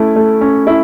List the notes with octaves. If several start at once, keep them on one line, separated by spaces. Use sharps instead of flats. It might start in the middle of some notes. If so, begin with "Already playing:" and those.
Already playing: A3 C#4 E4
A3
C#4
E4